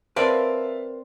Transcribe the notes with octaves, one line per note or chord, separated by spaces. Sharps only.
C4 A#4 B4 D5 E5 F5 A5